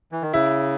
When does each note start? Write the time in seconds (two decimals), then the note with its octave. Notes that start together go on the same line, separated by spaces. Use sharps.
0.12 E3
0.22 D#3
0.33 C#3 E4